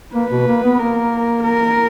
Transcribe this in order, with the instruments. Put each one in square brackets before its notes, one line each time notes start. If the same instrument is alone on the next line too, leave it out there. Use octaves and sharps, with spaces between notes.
[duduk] A#3 [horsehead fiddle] B4
[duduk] B2
A#3
B3
[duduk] A#3 [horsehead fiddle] A#4
[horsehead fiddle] A#4